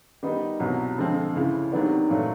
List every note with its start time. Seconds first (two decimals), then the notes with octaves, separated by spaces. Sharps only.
0.23 D#3 G3 B3 D#4
0.60 C2 B2 F#3
0.98 F2 D3 F3 G#3 C4
1.35 C#2 C#3 E3
1.72 C3 D#3 F#3 B3 D4
2.09 A#2 F#3 A3